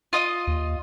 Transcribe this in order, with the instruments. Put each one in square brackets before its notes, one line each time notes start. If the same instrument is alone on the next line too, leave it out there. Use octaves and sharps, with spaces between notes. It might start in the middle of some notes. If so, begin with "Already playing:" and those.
[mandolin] F4 D#5
[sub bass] D#2